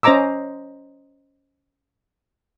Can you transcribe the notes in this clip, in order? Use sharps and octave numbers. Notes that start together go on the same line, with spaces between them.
C#4 C5 D#5 A#5 D6 E6